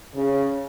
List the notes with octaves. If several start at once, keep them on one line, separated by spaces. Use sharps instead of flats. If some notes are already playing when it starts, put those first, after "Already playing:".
C#3